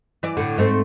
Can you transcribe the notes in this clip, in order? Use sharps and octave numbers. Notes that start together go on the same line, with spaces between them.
E3 D5
A2 D3
G#2 A3 C4